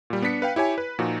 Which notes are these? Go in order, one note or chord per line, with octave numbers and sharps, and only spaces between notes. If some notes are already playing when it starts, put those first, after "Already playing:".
A#2 G3
B3 D4 B6 C#7
B4 F5 G5
E4 G4 C#5 G#5
B4
A#2 F3 D#4 F#4